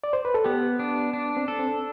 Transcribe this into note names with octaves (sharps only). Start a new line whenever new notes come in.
D5
C5
B4
A4
B3 G4
D4
D4
C4
A4
C4